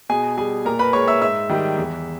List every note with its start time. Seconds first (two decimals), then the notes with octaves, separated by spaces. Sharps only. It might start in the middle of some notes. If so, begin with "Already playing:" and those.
0.09 B2 G#4 G#5
0.37 G3 G#4 G#5
0.65 A#2 A#4 A#5
0.79 B4 B5
0.93 G#3 C#5 C#6
1.08 E5 E6
1.21 G#2 E5 E6
1.49 D#3 G3
1.78 E2